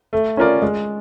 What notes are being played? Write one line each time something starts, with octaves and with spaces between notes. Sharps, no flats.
A3
C#4 F4 A#4 D5
G#3